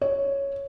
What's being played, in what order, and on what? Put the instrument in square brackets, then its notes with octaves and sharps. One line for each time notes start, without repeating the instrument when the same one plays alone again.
[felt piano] C#5